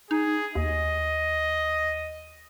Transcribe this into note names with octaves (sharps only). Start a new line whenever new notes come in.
D#4 G#4
D#2 D#5